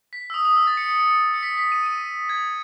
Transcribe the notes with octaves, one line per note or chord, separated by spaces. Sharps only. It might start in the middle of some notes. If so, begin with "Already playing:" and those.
B6
E6
D#6
D#6
E6
A6
C#7
C#7
C#7
C#7
B6
B6
D#7
D#7
G#6